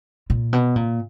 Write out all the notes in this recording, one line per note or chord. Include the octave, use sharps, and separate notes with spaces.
A#2
B2
A#2